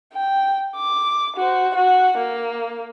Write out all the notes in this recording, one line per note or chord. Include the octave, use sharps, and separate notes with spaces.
G5
D6
F#4 C5
F#4 F#5
A#3